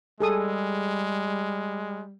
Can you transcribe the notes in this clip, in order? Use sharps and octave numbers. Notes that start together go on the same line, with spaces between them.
G3 G#3 G#4 A4 D#6